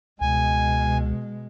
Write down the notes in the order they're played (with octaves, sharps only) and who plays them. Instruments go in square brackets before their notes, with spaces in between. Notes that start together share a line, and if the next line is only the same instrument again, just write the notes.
[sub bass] C#2 [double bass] B2 G#3 [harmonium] G#5